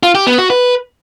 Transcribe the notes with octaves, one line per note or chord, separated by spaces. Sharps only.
F4
G4
B3
F#4
B4